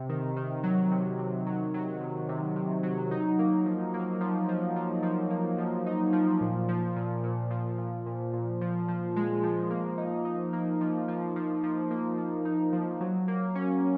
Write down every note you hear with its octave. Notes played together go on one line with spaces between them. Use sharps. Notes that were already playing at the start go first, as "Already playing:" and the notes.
Already playing: C3
D#3
D#3
F#3
C3
C3
F#3
F#3
C3
C3
C3
F#3
D#4
A#3
F3
A#3
F3
F3
F3
F3
A#3
F3
D#4
F3
A#2
F3
A#2
A#2
F3
A#2
A#2
A#2
F3
F3
G#3
F3
A#3
D#4
D#4
A#3
F3
F3
F3
F3
A#3
F3
D#4
F3
F#3
A#3
C#4